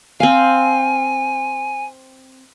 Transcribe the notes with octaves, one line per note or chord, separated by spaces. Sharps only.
C4 F5 G#5